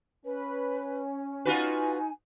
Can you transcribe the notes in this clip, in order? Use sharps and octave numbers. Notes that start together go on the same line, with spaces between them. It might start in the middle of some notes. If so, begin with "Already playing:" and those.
C#4 B4
D#4 F4 F#4 B4 G#5